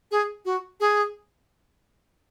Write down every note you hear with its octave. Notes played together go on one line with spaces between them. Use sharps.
G#4
F#4
G#4